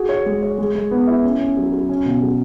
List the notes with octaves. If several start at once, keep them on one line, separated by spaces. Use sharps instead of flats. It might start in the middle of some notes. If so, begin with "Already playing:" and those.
Already playing: F#4 G#4
C#5
G#3
C#5
G#3
G#3
B3
E4
C#4
C#4
F#3
F#3
C#4
B2
F#3